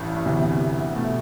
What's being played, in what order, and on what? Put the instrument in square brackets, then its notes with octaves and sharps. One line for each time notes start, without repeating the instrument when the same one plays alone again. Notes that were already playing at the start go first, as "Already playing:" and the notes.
Already playing: [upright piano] A1 G2 E3
D2 C3 E3 B3
B2 A3